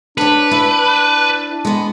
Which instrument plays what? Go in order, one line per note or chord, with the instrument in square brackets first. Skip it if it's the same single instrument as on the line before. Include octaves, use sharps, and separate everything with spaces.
[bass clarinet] D4 [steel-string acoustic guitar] G#4 C#5 [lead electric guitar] B4
[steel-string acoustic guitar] E4
G#3 B3